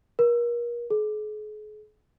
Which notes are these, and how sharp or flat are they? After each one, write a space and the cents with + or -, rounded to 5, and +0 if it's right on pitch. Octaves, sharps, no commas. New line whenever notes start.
A#4 +35
G#4 +40